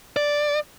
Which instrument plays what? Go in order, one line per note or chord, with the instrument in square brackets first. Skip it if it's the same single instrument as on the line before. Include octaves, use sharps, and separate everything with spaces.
[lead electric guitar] D5